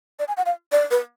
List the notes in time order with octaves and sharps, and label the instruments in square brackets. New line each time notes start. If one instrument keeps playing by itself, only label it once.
[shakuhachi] D5
G#5
F#5
F5
D5
B4